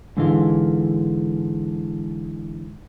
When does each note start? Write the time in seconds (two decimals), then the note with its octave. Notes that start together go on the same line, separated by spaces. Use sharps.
0.17 G#2 D3 E3 G#3 F4